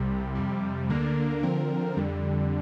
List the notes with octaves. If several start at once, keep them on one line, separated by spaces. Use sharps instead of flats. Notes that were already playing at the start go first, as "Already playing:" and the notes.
Already playing: C2 C3 G3
F2 C3 G3
D2 D3 A#3 D4 A#4
D3 F3 C4 A#4
F2 D3 G3